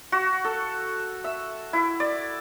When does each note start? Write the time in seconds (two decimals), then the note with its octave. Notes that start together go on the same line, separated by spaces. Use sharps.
0.12 F#4
0.44 A4
1.24 E5
1.73 E4
2.00 D5